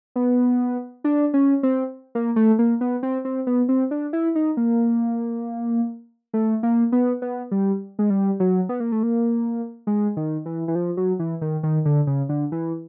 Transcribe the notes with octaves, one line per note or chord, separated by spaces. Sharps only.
B3
D4
C#4
C4
A#3
A3
A#3
B3
C4
C4
B3
C4
D4
E4
D#4
A#3
A3
A#3
B3
B3
G3
G#3
G3
F#3
B3
A#3
A3
A#3
G#3
D#3
E3
E3
F3
F#3
E3
D#3
D#3
D3
C#3
D3
E3